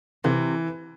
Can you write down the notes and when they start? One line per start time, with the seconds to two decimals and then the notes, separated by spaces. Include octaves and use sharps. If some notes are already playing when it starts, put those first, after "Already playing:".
0.24 C3 E3